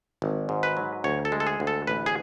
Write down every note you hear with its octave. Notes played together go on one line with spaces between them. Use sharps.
G#1
G#2
B4
F#3
D2 C#5
A4
G#3
A4
G#4
D2
A4
A1 B4
G#4